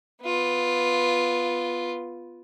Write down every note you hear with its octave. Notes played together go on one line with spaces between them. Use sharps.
B3 F4